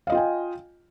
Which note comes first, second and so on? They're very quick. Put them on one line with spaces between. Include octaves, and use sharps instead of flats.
F5 D#5 F4 G5 G#5